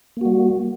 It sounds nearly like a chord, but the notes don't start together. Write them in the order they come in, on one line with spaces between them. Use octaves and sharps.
A#3 F#4 G3